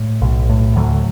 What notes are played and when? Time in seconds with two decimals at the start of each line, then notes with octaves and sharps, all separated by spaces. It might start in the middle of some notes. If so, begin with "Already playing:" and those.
Already playing: A2
0.21 B1
0.49 A2
0.76 D2 D3 F#3